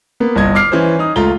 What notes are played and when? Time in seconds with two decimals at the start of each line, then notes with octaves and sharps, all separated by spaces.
0.20 A#3 B3
0.36 G1 C2 D#5 G#6
0.55 D6 F6 C7
0.72 E3 C#4 C5
0.99 D#4 D#6
1.16 C#2 A3 F4 A#5 G7